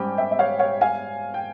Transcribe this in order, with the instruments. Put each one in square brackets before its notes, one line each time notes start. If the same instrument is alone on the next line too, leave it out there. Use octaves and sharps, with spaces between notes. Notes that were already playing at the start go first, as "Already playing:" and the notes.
Already playing: [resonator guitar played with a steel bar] G#2 G3 C#4 G4 [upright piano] G5
[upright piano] E5 G5
E5
C#5 F5
C#5 F5
F5 G#5
G5